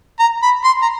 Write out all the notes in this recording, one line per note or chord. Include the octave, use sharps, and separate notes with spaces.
A#5
B5
C6
A#5